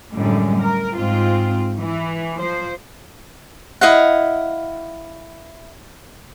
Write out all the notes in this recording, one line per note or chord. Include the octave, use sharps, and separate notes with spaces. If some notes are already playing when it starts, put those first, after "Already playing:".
F#2 A2 D3 G3 G#3
A#4
G#2 C4 F4
E3
F3 C5
E4 D#5 F5 F#5